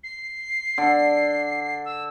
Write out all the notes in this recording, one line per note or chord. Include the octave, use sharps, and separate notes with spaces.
C7
D3
E6